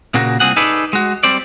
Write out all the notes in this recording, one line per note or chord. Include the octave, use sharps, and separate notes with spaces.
A#2 C#3 A#3 F#4
C2 A#2 C4 G#4 F#5
D#4 G#4 A4 B4 D5
G#3 F#4
G3 C4 C5 D5